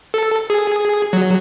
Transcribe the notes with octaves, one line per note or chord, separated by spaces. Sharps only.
A4
G#4
F#3